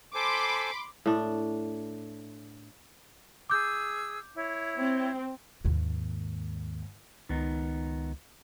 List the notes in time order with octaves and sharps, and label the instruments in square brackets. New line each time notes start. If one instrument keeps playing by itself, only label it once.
[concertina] A4 C5 G#5 [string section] B5 C6 D6
[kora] A2 D4
[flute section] G#4 E6 [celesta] D6 G6
[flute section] E4 C#5
[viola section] C4
[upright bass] D#2 G#2
[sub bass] C#2 [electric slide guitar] D#3 B3 D#4